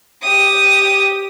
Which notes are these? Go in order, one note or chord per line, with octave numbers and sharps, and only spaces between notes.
G4 D#6